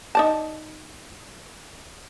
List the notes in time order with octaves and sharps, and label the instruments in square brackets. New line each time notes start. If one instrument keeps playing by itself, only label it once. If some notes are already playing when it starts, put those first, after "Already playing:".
[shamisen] D#4 D5 A5